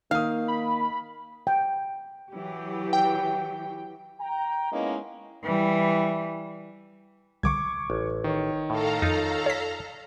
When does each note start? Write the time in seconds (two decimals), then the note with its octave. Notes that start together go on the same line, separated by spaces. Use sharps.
0.11 D#3 A#3 F5 D#6
0.48 B5
1.47 G5
2.32 E3 F#3 G4
2.93 G5
4.20 G5 A#5
4.72 G#3 A#3 B3 C#4 D#4 E4
5.44 E3 G3
7.43 C2 D3 C#6 D6 G#6
7.90 A1
8.24 D#3 C#5
8.70 A2 A4 F5 A#5
9.02 F2 D#4 F4
9.46 C#5 B6